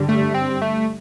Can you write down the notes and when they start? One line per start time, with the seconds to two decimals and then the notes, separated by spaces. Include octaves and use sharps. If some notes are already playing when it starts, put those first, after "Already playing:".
Already playing: G2 D3 G3
0.09 A3
0.34 C4
0.62 A3